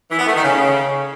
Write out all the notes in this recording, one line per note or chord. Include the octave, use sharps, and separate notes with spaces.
E3
B3
A3
D#3
C#3